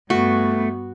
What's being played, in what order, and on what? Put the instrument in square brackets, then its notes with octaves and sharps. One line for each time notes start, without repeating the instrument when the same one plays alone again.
[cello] G2 B3 [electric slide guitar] A3 [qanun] F#4